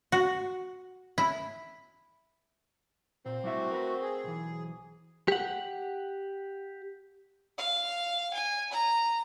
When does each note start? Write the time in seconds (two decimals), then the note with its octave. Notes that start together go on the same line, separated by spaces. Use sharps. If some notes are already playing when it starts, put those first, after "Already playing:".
0.12 F#4
1.18 E4
3.26 A#2 C4
3.44 G3 A3 E4 F#4 E5
3.71 A#4 B4
4.02 G#4
4.24 B1 E3
5.28 G4 F#5
7.58 F5
8.34 G#5
8.72 A#5